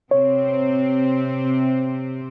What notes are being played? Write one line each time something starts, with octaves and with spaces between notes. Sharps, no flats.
C3 C4 C#5